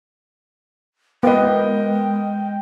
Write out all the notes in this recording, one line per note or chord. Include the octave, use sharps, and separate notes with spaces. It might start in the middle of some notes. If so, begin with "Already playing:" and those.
G#3 B3 A#4 B4 D#5 G5